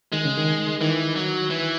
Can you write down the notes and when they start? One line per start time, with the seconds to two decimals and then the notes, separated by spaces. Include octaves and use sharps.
0.12 D#3 G#3
0.25 C#3
0.37 D#3
0.81 D#3 E3
1.16 F#3
1.50 E3